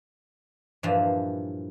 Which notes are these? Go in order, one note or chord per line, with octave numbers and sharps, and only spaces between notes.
G2 A#2 E3 F3